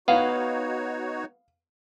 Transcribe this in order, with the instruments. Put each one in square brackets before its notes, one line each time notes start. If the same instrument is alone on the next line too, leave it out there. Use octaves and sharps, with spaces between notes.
[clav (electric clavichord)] B3 [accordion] D#4 F#4 C#5 [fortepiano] F5